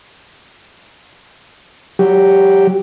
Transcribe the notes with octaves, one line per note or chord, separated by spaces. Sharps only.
F#3 G4